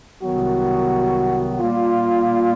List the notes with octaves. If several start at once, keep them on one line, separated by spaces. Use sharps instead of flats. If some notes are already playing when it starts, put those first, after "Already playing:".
C2 C3 D#3 F#3 B3 F#4
A#2 G3 A#3 F4